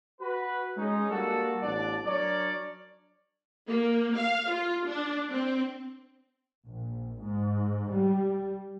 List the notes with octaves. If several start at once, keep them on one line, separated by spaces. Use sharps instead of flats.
F#4 B4
G#3 C#4 D#4
G3 A#3 D4 F#4 A4
A1 B2 D4 D5
F#3 D4 A#4 C#5 D5
A#3
F5
F4
D4
C4
A#1
G#2
G3